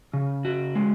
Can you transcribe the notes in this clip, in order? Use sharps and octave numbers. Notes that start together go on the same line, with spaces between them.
C#3
F#4
G#3